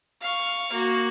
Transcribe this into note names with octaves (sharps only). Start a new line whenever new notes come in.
F5 C#6
A#3 F#4